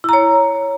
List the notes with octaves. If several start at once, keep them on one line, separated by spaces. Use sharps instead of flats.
E4 C#5 A#5